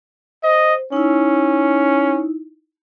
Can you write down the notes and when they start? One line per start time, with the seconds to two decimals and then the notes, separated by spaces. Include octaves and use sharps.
0.44 C5 D#5
0.92 C#4 D#4 E4